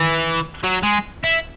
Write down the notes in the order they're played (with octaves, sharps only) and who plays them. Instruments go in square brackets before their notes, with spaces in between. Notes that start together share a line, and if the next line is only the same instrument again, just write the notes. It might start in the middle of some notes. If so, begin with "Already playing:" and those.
Already playing: [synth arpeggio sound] D#3 [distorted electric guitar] E3
[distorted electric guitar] F#3
G#3
E4